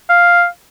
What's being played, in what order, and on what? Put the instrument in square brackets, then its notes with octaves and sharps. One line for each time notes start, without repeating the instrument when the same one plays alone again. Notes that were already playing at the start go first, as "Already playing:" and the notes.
[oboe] F5